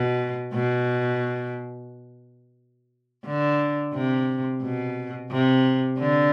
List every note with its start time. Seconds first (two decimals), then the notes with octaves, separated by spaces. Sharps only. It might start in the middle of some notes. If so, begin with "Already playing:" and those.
Already playing: B2
0.54 B2
3.26 D3
3.94 C3
4.63 B2
5.31 C3
5.99 D3